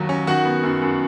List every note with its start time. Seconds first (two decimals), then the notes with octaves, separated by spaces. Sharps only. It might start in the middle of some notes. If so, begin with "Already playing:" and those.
Already playing: D#2 D#3 F#3 F#4
0.09 C#4
0.27 D#3 F#4 F#5
0.45 B3
0.63 F#2
0.82 F#2